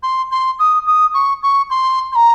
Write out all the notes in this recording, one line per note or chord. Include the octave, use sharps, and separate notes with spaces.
C6
C6
D#6
D#6
C#6
C#6
C6
C6
A#5